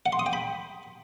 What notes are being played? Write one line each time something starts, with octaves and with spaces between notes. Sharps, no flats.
F#5
C6
D#6
G5
B5